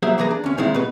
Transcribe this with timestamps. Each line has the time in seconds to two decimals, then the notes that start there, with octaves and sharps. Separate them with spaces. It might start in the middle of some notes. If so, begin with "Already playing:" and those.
0.03 F#3 A#3 G#4 C5 E5
0.18 E3 A#3 G#4 B4 A#5
0.31 D4
0.44 D2 C#4
0.58 A#2 D#3 G#3 A3 C4 E4
0.74 B2 B4